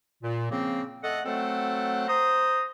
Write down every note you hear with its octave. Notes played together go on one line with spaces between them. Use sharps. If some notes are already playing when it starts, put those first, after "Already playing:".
A#2
C#3 F3 A#3 C4
A3 A4 D#5 F#5
F#3 A3 C4 A4 C5 F#5
C5 A#5 D#6